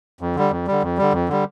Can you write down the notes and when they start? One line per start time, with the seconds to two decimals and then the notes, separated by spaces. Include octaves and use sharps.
0.21 F2
0.35 D3 G3
0.51 F2
0.67 D3 G3
0.83 F2
0.98 D3 G3
1.13 F2
1.29 D3 G3